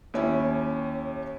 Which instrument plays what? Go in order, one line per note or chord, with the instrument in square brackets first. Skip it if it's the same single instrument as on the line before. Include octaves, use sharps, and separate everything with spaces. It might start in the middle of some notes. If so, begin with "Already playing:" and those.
[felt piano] D#2 C#4 E4